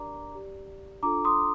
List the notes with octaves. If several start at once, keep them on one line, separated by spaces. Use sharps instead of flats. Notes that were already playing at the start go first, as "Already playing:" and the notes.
Already playing: D4 G4 A#4 D5 A#5 D6
G4 D5
D4 F4 A4 A#5 D6
C6 D#6